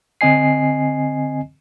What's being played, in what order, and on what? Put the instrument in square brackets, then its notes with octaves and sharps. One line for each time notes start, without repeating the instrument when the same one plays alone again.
[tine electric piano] D3 C4 D#5 G#5 C7